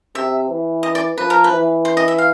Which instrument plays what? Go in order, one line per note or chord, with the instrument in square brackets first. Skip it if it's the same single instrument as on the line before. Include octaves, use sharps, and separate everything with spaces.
[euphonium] C3 [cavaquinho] E5
[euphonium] E3
[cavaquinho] D#5
D5
[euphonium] F3 [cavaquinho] B4
[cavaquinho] A#4
B4
[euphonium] E3
[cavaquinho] C5
D#5
E5
F5